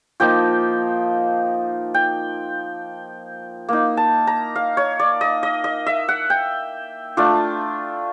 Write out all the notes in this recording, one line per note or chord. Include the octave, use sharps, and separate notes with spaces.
F3 A#3 D#4 G5
G5
A#3 D#4
A5
A#5
F5
C#5
D5
D#5
D#5
D#5
E5
F#5
G5
A3 D4 F4